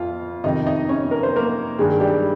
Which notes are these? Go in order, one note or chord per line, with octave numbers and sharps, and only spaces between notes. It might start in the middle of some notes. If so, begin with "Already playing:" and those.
Already playing: F2 F4 F5
F2 C3 D#3 D#4 D#5
D#4 D#5
C#4 C#5
A#4
C5
A#3 A#4
G2 D#3 G#3 G#4
G3 G4